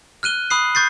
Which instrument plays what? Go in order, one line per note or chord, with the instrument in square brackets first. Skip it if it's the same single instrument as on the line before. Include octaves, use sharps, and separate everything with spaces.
[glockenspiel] F6 F#6 D#7 G7
B5 D#6 F#6 C7
C#6 G6 A6 C7